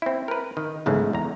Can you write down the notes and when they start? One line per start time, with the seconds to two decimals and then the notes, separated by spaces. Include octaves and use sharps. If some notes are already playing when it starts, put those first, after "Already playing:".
0.02 C4 E4
0.28 A#4 B4
0.57 D#3
0.86 B1 G#2 C#3 E3 G#3 A3
1.13 E2 A#5